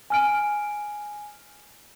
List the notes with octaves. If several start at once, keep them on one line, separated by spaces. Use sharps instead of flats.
G#5 F6 D7